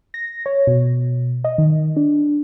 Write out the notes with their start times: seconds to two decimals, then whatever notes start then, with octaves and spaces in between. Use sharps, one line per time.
0.14 A#6
0.46 C#5
0.67 B2
1.44 D#5
1.58 D#3
1.96 D4